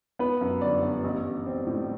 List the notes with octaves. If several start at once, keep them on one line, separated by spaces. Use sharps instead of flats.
B3 B4
F#2
G1 D5
B3
A1
A1
C4
A2